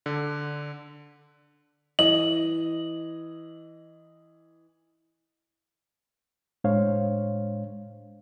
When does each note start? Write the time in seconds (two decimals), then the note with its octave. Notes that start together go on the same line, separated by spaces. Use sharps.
0.06 D3
1.99 E3 D#5 F#7
6.64 A2 G#3 D4 C5 C#5 F5